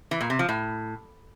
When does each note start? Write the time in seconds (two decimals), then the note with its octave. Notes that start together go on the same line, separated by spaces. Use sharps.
0.11 E3
0.21 A#2
0.30 C3
0.39 F3
0.49 A2